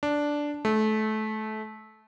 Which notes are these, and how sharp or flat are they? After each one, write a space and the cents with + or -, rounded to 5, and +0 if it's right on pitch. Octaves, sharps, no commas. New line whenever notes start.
D4 -5
A3 -25